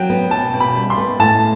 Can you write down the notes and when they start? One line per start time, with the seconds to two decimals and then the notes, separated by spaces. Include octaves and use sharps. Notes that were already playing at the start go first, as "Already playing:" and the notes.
Already playing: F#3 G5
0.10 B3
0.31 B2 A5
0.53 B2
0.60 B5
0.76 G3
0.90 C6
0.98 B3
1.19 A2 A5